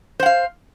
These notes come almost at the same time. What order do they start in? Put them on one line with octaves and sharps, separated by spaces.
C5 F#5 F5